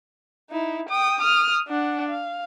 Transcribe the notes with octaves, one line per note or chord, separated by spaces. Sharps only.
D#4 E4
G5 D#6
D#6 F6
D4 F#5
F5